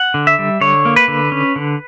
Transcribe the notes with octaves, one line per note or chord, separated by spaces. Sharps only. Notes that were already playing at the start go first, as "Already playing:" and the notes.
Already playing: F#5
D3
E5
G3
D3 C#5
A#3
B4
D3
C#4
D3